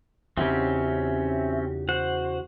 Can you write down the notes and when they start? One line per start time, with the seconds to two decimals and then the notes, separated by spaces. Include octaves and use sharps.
0.37 E2 C#3 C4 C#4 D#4 F#4 G4 E5
1.89 F#4 C5 F#5